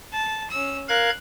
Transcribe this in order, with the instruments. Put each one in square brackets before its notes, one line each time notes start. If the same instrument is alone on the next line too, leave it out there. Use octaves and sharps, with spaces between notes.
[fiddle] A5
C#4 E6
[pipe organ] A#4 F5 G#6 [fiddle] F#6